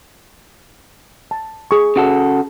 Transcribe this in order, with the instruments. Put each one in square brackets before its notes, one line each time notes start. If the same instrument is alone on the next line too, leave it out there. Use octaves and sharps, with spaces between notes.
[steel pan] A5
G#4 C#6
[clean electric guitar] C#3 F#4 A4